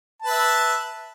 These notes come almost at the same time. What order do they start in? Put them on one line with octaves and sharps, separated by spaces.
A5 B4 E5